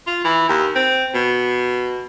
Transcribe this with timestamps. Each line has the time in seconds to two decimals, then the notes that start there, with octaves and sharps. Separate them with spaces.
0.07 F4
0.24 E3
0.49 D#2
0.75 C4
1.14 B2